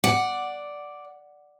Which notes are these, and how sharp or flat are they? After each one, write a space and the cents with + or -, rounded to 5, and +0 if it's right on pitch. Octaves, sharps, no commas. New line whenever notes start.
D5 +0 F#5 +0